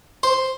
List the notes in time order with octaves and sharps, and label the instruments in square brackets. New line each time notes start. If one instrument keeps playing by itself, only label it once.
[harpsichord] C5